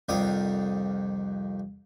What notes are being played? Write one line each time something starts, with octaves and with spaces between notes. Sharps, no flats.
C2 F2 D#3 D5 F5 D#6